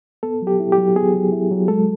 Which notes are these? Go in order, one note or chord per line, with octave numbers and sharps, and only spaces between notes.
B3 A4
F#3 G4
E4
G4
F#3
B3 G#4
F#3
E4
F#3
G#3 A4